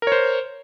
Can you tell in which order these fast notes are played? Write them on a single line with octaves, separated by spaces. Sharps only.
A#4 C#5 C5